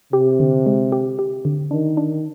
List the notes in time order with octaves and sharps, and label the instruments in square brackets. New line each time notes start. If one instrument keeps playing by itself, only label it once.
[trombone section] C3 [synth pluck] G4
[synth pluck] D3
G#3
G4
G4
D3
[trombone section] D#3 [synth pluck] D4
[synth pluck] D4